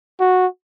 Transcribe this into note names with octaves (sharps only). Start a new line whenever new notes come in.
F#4